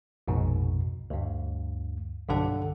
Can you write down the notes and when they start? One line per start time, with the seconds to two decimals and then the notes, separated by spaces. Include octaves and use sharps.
0.28 A#1 F2 G#2 B2
1.10 D2 G2
2.29 B1 G2 D3 D4 A4 F#5